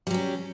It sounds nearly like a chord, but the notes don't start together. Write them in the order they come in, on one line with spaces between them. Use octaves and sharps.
G3 F#3 C#4